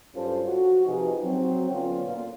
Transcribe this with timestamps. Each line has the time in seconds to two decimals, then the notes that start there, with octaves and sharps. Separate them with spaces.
0.15 G2 F#3 C#4 F4 A4 C5
0.47 F#4
0.86 C3 F3 D#4 G4 G#4 B4
1.22 F#3 C4
1.71 D3 B3 C#4 F4
2.04 A#2 F4